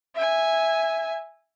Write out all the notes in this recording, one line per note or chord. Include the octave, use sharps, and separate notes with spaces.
E5 G#5